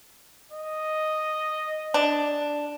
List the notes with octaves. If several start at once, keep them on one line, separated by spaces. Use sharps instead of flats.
D#5
D4